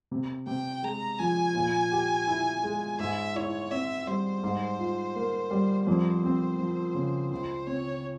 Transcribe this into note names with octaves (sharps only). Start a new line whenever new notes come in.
C3
C3 G5
G#3 A#5
F3 G#5
A#2
G4
E4
G#3
G#2 E5
E4 C#5
C4 E5
G3 C5
G#2
F4
A#3
G3
F2 C5
C4
F3
C#3
C#2 C5
C4 C#5